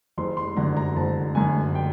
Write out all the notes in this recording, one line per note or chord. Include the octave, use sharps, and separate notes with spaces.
F#1 C6
C6
F#2 D3 A#5
A#5
F#1 A5
F#2 D3 G#5
G5